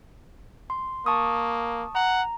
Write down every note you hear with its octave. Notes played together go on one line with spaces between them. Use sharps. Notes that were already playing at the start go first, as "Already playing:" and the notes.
C6
A#3 A5 C#6 D#6
F#5 A#5